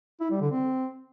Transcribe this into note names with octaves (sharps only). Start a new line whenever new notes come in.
E4
G3
D3
C4